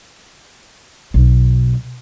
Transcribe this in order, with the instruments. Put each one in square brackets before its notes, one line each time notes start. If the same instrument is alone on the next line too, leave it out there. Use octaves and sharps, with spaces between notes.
[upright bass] B1